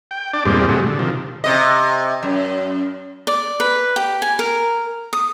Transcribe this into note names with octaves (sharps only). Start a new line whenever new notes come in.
G5
D4 D5
E2 G2 A#2 G3 G#3 C4
C3 F#3 G#3 A3
D3
C3 D#3 F3
C3 D#5
F#2
D5
B4
G4
G#5
A#4
D#6